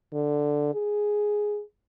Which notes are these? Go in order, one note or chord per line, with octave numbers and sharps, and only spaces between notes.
D3
G#4